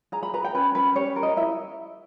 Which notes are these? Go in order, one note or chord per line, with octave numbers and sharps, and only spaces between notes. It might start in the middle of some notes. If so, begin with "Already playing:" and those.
G#4 A#5
B5
B4 A#5
G5
C#4 B4
C#4 B4
G4 C#5
A#4
D#5
E4 E5